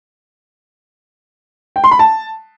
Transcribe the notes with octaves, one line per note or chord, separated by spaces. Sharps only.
G5
C6
B5
A5